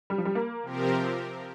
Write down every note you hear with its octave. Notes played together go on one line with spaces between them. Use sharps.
G3
F3
G3
A#3
C3 F3 C4 G4 A#4